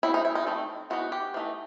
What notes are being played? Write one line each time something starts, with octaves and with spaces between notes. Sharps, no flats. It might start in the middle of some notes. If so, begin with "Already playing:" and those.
F#3 C4 D#4 E4
D#4
E4
D#4
D#3 A3 C4 D#4
E3 B3 D#4 F#4
G4
E3 A3 D#4